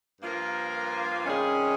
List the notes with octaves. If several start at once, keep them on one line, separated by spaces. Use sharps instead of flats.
G2 F3 A#3 F4 A#4
C3 D#3 G3 C#4 G#4